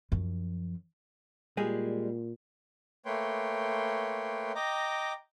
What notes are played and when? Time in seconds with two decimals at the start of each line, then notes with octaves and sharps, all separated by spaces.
0.12 F#2 F3
1.57 A#2 G3 G#3 G#4
3.05 A3 A#3 B4 C#5 G5 C6
4.55 D#5 G5 A#5 D6